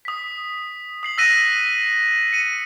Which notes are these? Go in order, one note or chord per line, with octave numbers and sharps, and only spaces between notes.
D#6 B6
D#6 C7 F#7
E6 F#6 A#6 B6 D#7
C#7 D#7